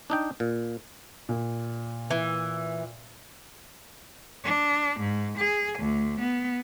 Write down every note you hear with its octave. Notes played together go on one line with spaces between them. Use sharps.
D4 D#4 G5
A#2
A#2
E3
D4
G#2
G#4
D2
B3